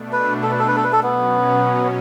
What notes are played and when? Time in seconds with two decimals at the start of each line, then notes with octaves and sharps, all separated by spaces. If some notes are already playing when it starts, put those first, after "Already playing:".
Already playing: B2 A3 D4
0.13 B4
0.43 A4
0.52 B4
0.59 A4
0.68 B4
0.76 A4
0.84 B4
0.92 A4
1.03 B2 F#3 B3 C#4